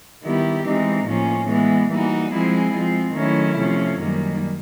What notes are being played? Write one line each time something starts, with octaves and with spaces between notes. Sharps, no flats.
D#3 G3 B3 E4 G4
E3 G#3 C4 D#4
A2 F3 A#3 C#4
E3 G#3 B3
E3 G3 A#3 D#4 F#4
F3 G#3 C4 E4 G#4
F3 G#3 C4
D#3 F#3 A3 C#4 E4
C3 F3 A3 C#4
F#2 D#3 G3 A#3